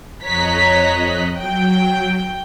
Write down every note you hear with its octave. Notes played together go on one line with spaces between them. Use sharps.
F2 C#5 D#5 A#5 F#6 B6
F#3 G5